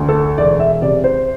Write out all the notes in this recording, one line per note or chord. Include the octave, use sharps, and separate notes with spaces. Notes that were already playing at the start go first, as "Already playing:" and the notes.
Already playing: D2
A4
E1 D5
E5
C3 D5
C5